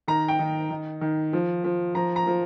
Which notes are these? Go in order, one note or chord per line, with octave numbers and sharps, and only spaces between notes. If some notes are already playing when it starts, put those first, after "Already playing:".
D#3 A#5
G5
D#3
D#3
D#3
F3
F3
F3 A#5
A#5
F3